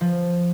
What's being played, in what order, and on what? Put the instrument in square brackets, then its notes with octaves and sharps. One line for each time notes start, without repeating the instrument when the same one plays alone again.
[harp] F3